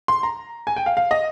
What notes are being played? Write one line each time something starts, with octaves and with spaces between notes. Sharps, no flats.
C6
A#5
G#5
G5
F5
F5
D#5